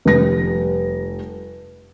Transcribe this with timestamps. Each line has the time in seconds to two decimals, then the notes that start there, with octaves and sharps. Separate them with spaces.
0.05 F1 G3 A#6